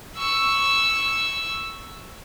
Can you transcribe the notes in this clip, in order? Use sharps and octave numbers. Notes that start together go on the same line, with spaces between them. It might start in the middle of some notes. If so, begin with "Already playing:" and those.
C#6 E6